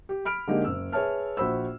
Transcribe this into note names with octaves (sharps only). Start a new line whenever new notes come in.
G4
B5 F6 D7
D3 G#3 A#3 D#4 G4
F#1 E6
G#4 B4 C#5 E5 A5 F6
A#1 F#4 C5 B5 E6